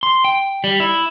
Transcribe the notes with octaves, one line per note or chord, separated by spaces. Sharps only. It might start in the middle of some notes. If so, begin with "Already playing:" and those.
C6
G5
G3
E4